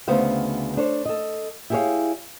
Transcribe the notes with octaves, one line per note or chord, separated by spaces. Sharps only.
D2 C#3 B3 C5 F5
D4 A4 C5 C#5
A4 D#5
E4 G4 G#4 A#4 C#5 F5